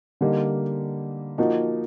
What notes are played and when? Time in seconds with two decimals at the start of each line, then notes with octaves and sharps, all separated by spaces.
0.21 D3 G3 A#3 D#4
1.38 F3 A#3 D#4 F#4